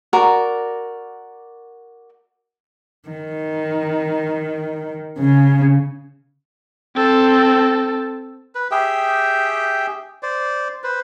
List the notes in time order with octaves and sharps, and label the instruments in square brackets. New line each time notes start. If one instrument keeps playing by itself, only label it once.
[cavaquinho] F#4 A#4 D5
[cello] D#3
C#3
[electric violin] C4 A4
[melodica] B4
G4 G#4 E5 G5
C5 D5
B4 C5